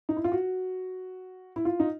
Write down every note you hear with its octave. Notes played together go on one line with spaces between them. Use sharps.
D#4
E4
F4
F#4
E4
F4
D#4